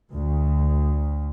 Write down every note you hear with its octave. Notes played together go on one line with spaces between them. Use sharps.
D2